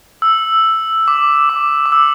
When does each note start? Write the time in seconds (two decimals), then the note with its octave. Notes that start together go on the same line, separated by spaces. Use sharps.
0.22 E6
1.08 D6
1.49 D6
1.86 D6
1.92 E6